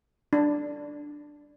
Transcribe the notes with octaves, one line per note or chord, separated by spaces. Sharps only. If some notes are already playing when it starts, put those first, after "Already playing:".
D4